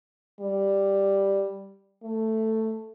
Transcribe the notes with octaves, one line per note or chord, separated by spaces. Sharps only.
G3
A3